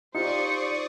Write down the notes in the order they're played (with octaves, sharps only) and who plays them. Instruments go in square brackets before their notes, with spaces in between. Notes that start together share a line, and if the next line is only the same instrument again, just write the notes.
[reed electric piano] D#4 F4 G4 [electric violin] C5 [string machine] D5 C#6 D#6 [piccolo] C#7